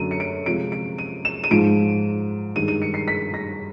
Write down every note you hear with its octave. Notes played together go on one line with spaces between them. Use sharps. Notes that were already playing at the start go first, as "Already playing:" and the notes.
Already playing: F#2 D3 F#3 A3 D#7
C#7
D7
C3 F3 G#3 D7
D7
D#7
E7
D#7
G#2 F3 G#3 D7
G2 D#3 G#3 D#7
D#7
C#7
C7
B6
A#6